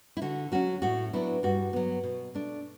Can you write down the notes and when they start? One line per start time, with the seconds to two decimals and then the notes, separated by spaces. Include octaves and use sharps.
0.17 E4
0.22 D3 F#4
0.52 F#3 C#4 F#4
0.82 A2 F#4
1.13 F#3 B3 D4 E4
1.43 G2 F#4
1.73 F#3 B3
2.04 B2
2.34 A3 D4